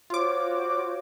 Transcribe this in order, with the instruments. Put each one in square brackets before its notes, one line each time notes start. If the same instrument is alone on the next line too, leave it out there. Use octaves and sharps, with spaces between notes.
[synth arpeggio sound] F4 D6 [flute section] F#4 C5 C#5